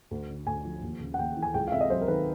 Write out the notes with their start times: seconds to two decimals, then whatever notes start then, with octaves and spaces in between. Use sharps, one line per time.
0.11 D2
0.29 D3
0.47 D2 G#5
0.65 F3
0.82 D#2
1.00 C#3
1.14 F#5
1.18 D#2 G5
1.37 E3
1.43 G#5
1.54 C#2 G5
1.68 F5
1.72 C3 E5
1.81 D#5
1.90 F#3 C5
2.01 A#4
2.08 D#3 B4